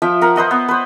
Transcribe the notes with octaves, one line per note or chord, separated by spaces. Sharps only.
F3 E5 G5
A#4 F#5
B4 C5 D#5 F#5
B3
B4 C5